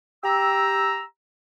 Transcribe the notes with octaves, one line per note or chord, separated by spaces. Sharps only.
G4 A#5 E6